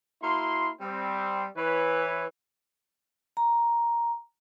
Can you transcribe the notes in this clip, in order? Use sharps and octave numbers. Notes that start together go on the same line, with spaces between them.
A#3 E4 F#4 C6
G3 C4
E3 B4 C#5
A#5